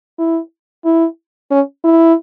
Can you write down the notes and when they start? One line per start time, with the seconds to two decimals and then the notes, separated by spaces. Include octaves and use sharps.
0.19 E4
0.85 E4
1.51 C#4
1.84 E4